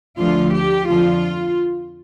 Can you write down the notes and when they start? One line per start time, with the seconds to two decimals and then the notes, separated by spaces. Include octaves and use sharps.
0.18 D2 D3 F3 F4
0.53 G4
0.88 F2 D3 F3 F4